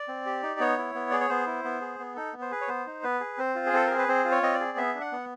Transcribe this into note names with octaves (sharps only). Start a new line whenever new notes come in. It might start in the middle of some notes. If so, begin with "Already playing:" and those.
Already playing: D5
C4
G4
D#4
B3 C#5
E4
B3
G#4 D5
C#5
B3 C5
E4
B3
G#4
B3
D#4 A4
B3
C5
G#4 B4
C#5
B3 C5
D#4
B3 B4
G#4
C4 C5
F4
G#4
C4 A4
G#4 A#4
B4
C4 C5
F4
C#5
C4 D#5
D5
G#4
B3 E5
D4
F#5
B3